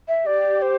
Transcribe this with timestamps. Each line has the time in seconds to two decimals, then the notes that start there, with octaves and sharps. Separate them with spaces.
0.08 E5
0.26 G4 D5
0.62 C5